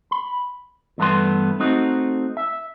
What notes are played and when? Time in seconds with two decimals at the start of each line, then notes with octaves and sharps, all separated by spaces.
0.11 B5
0.98 E2 G2 A3 B3 B4 C6
1.60 A3 C4 D#4 F#4
2.37 E5